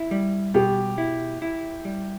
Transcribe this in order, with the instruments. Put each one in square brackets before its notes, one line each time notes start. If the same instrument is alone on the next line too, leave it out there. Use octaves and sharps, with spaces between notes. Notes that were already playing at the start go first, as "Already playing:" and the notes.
Already playing: [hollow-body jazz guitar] E4
G3
[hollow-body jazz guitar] B2 [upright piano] G4
[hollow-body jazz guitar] E4
E4
G3